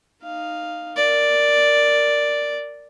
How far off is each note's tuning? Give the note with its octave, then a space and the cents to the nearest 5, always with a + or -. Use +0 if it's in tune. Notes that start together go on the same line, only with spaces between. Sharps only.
D#4 -10 F5 +0
A#4 -5 D5 +0